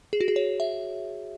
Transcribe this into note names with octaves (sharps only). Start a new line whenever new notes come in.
G#4
F#4
G#4
C#5
E5